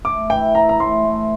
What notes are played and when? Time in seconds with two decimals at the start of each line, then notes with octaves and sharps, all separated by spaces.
0.05 A3 D6
0.30 E3 G5
0.55 E4 A#5
0.69 A#5
0.79 A2 C6
1.04 A3